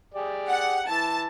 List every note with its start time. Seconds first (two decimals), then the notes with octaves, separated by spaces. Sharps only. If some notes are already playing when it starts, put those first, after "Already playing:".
0.14 G4 G#4 D5
0.50 F#5
0.89 E3 A5